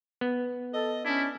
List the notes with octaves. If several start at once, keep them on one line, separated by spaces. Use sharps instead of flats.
B3
A4 D#5
C#4 D4 E4